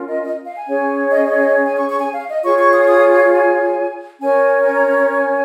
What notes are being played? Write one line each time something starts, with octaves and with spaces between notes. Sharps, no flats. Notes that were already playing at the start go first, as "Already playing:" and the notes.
Already playing: C#4 F4 A#4
D#5
D#5
F5
G#5
C#4 G#4 C#5
D#5
D#5
D#5
G#5
C#6
C#6
G#5
F5
D#5
F4 G#4 C#5 C#6
C#6
D#6
C#6
D#6
G#5
C#4 A#4 C#5 G#5
G#5
A#5
A#5
A#5
G#5